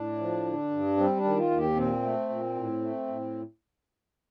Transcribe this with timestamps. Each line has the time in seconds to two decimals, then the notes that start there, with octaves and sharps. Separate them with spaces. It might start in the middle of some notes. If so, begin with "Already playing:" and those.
Already playing: A2 D4
0.19 F3
0.45 D3
0.71 G2
0.97 G3 C4
1.17 D4
1.24 D#3
1.37 F4
1.51 D#2
1.57 G4
1.76 A#2 C4
2.03 A3
2.29 A#2
2.55 A2
2.82 A3
3.08 A2